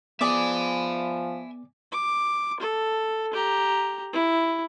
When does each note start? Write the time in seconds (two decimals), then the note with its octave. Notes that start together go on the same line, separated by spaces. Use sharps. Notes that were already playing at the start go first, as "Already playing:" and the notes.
0.21 F3 B3 G#4 D5 E5 G#5 D6
1.92 D6
2.60 A4
3.33 G4 A#5
4.13 E4